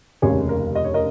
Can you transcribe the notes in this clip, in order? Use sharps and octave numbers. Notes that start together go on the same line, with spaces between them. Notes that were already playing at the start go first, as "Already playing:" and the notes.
F1 D#2 C#3 A#3 G#4 C#5
A#4
D#5
C#5
A#4 D#5